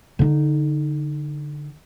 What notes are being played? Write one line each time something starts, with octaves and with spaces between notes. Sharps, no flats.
D3 D#4